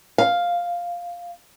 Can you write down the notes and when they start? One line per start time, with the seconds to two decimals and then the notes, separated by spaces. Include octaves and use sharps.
0.18 F5